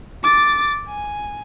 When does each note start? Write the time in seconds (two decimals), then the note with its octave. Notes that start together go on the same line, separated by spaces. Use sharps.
0.23 D6 A6
0.88 G#5